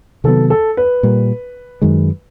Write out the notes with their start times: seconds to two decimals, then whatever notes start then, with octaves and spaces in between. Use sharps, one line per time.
0.24 C3 D#3 F#3 B3 A4
0.50 A4
0.77 B4
1.03 A#2 G3 A#3
1.82 F#2 D#3 G#3